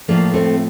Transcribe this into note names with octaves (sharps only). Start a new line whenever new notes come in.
A2 F3 A#3 D4
A3 C4